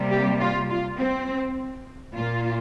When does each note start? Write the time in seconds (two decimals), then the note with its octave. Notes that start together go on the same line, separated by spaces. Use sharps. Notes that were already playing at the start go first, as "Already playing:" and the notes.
Already playing: C3 G3 A#3
0.11 G4
0.41 F4
0.70 F4
0.99 C4
2.15 A#2 A#3 F4